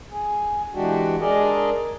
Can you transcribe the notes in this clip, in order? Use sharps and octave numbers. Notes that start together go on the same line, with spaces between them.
G#4
E3 G#3 D4 F#4 G4
G#3 D4 G#4 A#4 D5 D#5